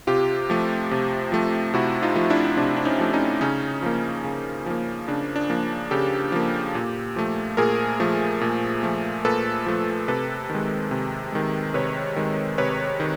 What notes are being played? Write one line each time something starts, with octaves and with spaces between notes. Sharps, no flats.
C3 F4 G4
F3 A3
C3
F3 A3
C3 E4 F#4
D#4 F4
F3 A3
D4 E4
C3 D4
D4
C#4 D#4
F3 A3
C#4 D#4
C#3 C#4 D#4
F3 A#3
C#3
F3 A#3
C#3 D4
D4
F3 A#3
C#3 G4 A4
F3 A#3
A#2
F3 A3
A#2 G#4 A#4
F3 A3
A#2
F3 A3
A#2 A4 B4
F3 A3
C3 A4 B4
D#3
G#3
C3
D#3 G#3
C3 B4 C#5
D#3 G#3
C3 B4 C#5
D#3